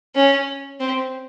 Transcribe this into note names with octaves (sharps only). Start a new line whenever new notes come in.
C#4
C4